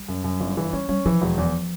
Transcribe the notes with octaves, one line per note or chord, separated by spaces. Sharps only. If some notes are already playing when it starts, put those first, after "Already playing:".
Already playing: G3
F#2
F#2
G1
E3
G3 C#4
G3 C#4
E3 F3
E1
E2